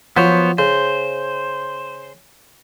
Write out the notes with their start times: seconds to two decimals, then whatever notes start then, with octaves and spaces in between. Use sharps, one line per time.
0.17 F3 F#3 B3 C5 C#5
0.58 C#3 C5